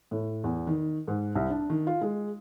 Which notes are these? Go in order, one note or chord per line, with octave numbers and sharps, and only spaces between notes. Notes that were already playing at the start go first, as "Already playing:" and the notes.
A2
E2
D#3
G#2
C2
D4
D#3
F4
G#3